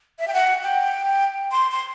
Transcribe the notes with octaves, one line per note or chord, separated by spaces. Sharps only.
E5
G5
F#5
G5
C6
C6